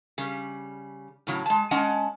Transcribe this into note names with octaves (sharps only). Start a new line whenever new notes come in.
C#3 G3
A2 C#3 F#3
G#3 A5
G#3 C#4 D#5 F#5 A5